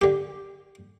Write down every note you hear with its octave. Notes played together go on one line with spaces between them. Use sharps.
D3 G4